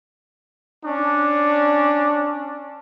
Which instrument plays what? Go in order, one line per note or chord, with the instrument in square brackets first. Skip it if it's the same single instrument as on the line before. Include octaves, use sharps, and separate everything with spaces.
[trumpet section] C#4 D4